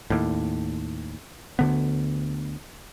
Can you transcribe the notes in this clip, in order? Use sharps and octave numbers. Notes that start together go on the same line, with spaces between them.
D#2 A2
D2 D3 B3